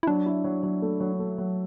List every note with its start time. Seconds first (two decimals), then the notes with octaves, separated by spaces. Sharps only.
0.03 E4
0.07 F#3 D4
0.26 E4
0.44 F#3
0.63 F#3
0.82 A3
1.00 F#3
1.19 A3
1.38 F#3